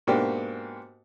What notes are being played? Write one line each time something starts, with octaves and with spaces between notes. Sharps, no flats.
G#2 B2 A#3 D4 F#4 G4